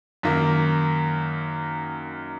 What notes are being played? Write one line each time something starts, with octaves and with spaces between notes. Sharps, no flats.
F#2 D#3 A#3